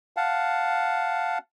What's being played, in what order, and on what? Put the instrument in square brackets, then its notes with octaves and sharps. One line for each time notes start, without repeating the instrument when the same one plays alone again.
[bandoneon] F5 F#5 A5